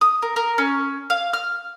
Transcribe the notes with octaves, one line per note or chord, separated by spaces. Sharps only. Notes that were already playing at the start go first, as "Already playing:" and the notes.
D#6
A#4
A#4
C#4
F5
F6